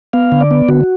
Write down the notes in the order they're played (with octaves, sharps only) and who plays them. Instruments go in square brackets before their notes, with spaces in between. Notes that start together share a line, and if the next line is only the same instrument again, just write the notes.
[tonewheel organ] B3 F5
D3
D5
B3
D3 F#4